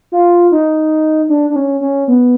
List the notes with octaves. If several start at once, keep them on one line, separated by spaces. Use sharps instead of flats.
F4
D#4
D4
D4
C#4
C#4
B3